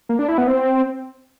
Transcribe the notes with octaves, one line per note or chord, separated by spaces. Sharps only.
A#3
D4
E4
B3
C4